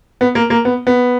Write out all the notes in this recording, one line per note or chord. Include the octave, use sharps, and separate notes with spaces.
B3
A#3
A#3
B3
B3